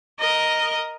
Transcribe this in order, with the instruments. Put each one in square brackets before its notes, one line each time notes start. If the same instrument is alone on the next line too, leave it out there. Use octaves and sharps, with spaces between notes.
[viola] A#4 D#5